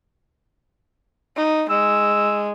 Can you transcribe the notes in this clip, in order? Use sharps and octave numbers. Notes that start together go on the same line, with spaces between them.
D#4
G#3 E6